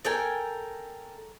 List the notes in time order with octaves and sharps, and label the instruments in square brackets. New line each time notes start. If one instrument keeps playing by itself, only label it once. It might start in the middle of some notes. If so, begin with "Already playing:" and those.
[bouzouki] A4 A#4 G5 G#5